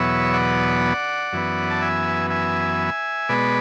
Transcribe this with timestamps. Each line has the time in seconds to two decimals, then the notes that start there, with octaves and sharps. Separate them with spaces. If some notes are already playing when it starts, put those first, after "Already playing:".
Already playing: E2 B2 F#3 B3 C#5 E5
0.33 D5 F#5
1.33 F#2 E3 B3
1.70 A5
1.82 E5 G#5
2.30 E5 G#5
3.29 B2 G#3 B3 B4 D5